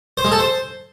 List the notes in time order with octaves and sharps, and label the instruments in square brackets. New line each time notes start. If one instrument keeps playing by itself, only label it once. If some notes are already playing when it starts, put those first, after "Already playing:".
[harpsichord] C5
G#3
A4
C5